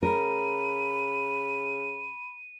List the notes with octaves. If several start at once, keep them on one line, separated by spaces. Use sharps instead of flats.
C#3 A#4 B5 D#7